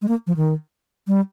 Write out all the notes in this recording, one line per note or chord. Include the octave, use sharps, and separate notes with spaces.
G#3
A#3
F3
D#3
G3